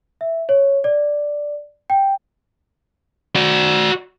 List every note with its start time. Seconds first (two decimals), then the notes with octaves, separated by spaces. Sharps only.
0.21 E5
0.49 C#5
0.84 D5
1.90 G5
3.36 F#4 D5